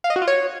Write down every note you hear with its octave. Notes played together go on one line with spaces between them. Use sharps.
F5
D#5
F#4
F4
C#5